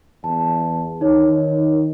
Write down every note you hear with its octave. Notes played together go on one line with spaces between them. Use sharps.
E2 A5
D#3 D#4 C#5